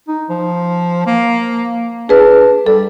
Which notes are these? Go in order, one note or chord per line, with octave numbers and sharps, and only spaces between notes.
D#4
F3
A#3
D4 G#4 B4
G3 A4